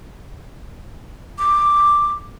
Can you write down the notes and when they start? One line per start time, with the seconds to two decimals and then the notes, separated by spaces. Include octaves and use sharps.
1.38 D6